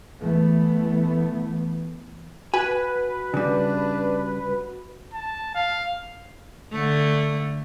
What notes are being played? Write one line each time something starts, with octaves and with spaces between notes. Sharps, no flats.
E3 A3 B3
F#4 B4 G#5
C#3 G3 D4
A5
F5
D3 A3